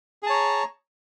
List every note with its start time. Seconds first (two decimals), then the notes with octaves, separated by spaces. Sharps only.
0.23 G#4
0.26 A5
0.30 C#5
0.33 A#5